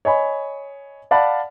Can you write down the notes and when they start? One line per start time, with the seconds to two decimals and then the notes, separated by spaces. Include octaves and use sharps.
0.05 C#5 D#5 G#5 B5
1.11 D5 F5 F#5 A5 B5